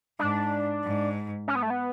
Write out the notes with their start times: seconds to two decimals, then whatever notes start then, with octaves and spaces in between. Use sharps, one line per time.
0.19 G#2 D4
0.84 G#2
1.48 C#4
1.55 B3
1.63 A3
1.70 B3